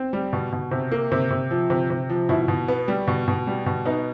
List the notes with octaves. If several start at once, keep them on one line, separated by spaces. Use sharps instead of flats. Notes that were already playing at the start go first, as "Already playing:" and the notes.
Already playing: C4
G3
B2
B2
C3
A#3
C3
C3
F3
C3
C3
F3
B2 E4
B2
B3
G3
B2
B2
G3
B2
B3 D#4